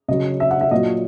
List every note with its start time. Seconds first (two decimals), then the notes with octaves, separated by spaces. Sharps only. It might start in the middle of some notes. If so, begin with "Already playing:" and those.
0.08 C#3 F#3 D#5
0.40 E5
0.51 F#5
0.61 E5
0.71 A#2 F#3 D#5